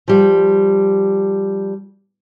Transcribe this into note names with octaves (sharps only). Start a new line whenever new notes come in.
F3 G3